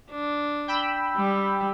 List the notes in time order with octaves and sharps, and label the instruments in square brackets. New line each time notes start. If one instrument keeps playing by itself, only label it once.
[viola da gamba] D4
[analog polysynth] G5 B5 E6
[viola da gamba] G3